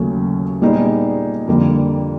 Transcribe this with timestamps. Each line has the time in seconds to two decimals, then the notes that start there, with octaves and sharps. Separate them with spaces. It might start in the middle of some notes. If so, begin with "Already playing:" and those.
Already playing: D#2 C#3 F#3 A3 C#4
0.62 A#2 G3 B3 D#4 G#4
1.47 F2 D3 G3 A#3